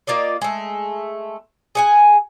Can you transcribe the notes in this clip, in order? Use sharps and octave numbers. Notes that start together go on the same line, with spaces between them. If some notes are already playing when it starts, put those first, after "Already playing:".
A#3 F4 D5 D#5
G#3 A3
G#4 F#5 G#5